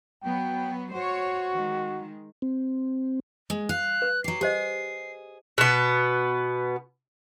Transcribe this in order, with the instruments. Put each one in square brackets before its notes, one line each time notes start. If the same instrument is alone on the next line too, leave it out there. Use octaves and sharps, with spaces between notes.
[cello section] F#3 B3 [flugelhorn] G5
[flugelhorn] F#4 [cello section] C5 C#5
[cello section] D#3 G#3
[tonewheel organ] C4
[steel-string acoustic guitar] G#3
[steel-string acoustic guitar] F5 [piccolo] F#6
[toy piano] B4
[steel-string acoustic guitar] F#3 G4 [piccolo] C7
[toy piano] G4 C5 D#5 [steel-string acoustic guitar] G#4
[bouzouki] B2 B3